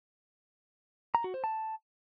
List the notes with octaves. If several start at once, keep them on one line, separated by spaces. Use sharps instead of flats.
A#5
F#4
C5
A5